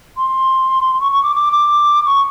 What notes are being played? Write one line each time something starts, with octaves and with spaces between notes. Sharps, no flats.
C6
C#6
C#6
D6
D6
D6
C#6